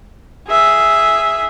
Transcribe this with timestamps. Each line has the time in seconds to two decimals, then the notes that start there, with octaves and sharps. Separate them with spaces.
0.48 G#4 E5